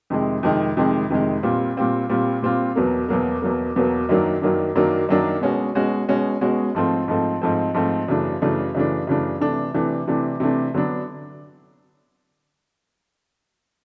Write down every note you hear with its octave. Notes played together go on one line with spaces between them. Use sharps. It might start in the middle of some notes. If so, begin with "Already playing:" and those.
F2 C3 D#3 G#3
F2 C3 D#3 G#3
F2 C3 D#3 G#3
F2 C3 D#3 G#3
A#2 G3 C4 F4
A#2 G3 C4 F4
A#2 G3 C4 F4
A#2 G3 C4 F4
E2 B2 F#3 A#3
E2 B2 F#3 A#3
E2 B2 F#3 A#3
E2 B2 F#3 A#3
F#2 D#3 F#3 A#3 D4
F#2 D#3 F#3 A#3 D4
F#2 D#3 F#3 A#3 D4
F#2 D#3 F#3 A#3 D4
B2 G#3 C#4 F#4
B2 G#3 C#4 F#4
B2 G#3 C#4 F#4
B2 G#3 C#4 F#4
G#2 F3 A3 C4
G#2 F3 A3 C4
G#2 F3 A3 C4
G#2 F3 A3 C4
F#2 C#3 E3 A3 D4
F#2 C#3 E3 A3 D4
F#2 C#3 E3 A3 D4
F#2 C#3 E3 A3 D4
C3 E3 A3 D4
C3 E3 A3 D4
C3 E3 A3 D4
C3 E3 A3 D4
D3 F#3 B3 D4